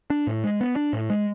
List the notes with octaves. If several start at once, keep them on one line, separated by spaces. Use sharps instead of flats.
D4
A2
G#3
B3
D4
A2
G#3